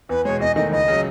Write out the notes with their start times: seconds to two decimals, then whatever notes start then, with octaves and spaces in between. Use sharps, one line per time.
0.09 E2 B4
0.25 B2 G#3 C#5
0.40 E2 D#5
0.56 D#3 A3 D#5
0.72 C#2 D#5
0.88 C#3 F#3